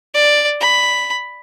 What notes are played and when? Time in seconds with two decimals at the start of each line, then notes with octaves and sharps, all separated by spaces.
0.14 D5
0.60 B5